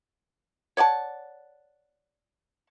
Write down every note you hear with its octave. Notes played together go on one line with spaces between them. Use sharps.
C#5 D5 F#5 A5